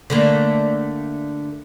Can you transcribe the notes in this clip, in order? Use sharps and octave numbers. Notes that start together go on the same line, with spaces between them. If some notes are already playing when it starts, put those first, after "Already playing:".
D3 A3 A#3